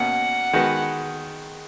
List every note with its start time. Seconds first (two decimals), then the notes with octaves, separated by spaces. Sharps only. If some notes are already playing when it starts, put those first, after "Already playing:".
Already playing: B2 A#3 C#4 F#5
0.53 D#3 G#3 B3 F#4 B4